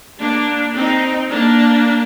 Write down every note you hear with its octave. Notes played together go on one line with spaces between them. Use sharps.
A#3 D4
C4 D#4
A#3 D4